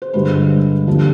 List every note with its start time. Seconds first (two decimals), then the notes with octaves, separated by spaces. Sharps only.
0.02 C5
0.13 G2 D3 G#3 B4
0.87 D#2 D3 F3